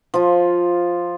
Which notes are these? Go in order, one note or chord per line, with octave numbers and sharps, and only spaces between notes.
F3 F4